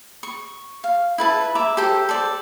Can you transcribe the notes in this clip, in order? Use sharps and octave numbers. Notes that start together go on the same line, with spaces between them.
C#6
F5
E4 B4 A5
E5 A#5 D6
G4 A4 C5
A4 C5 D5